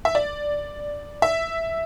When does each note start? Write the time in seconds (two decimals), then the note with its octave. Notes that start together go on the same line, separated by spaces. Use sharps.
0.05 E5
0.15 D5
1.22 E5